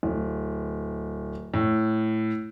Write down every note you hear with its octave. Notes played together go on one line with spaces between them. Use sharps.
D1
A2